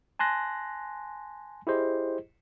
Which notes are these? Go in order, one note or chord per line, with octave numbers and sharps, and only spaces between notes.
G#5 A5 C6 F#6 A#6
E4 G4 G#4 C5 D#5